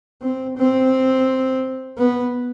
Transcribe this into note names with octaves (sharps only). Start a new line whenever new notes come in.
C4
C4
B3